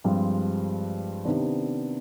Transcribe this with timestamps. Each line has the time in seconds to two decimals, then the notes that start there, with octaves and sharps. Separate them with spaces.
0.04 G2 F3 G#3 C4 G4
1.25 C3 D#3 B3 D4